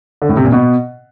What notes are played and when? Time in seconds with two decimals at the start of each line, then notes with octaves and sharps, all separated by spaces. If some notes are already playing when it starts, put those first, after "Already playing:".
0.22 D3
0.29 A2
0.37 C3
0.45 A#2
0.52 B2